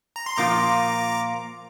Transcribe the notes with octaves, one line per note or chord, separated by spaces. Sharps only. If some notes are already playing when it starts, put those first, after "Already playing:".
A#5
C6
A#2 F3 A#3 F4 A#5 D6